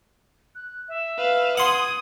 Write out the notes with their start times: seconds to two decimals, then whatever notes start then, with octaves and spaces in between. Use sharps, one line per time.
0.55 F#6
0.88 E5
1.18 B4 F5
1.57 F#5 C6 D#6 G#6